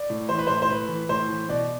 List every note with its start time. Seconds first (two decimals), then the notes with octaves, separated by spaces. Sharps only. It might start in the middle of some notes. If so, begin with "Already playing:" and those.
Already playing: D5
0.10 A2
0.29 E3 C5
0.38 B4
0.47 A2 C5
0.62 C5
0.69 A2 B4
0.88 E3
1.09 A2 C5
1.28 E3
1.49 B2 D5